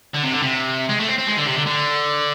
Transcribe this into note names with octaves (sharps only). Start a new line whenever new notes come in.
D3
C3
D3
C3
G#3
A3
C4
C4
G#3
D3
C3
D3
D3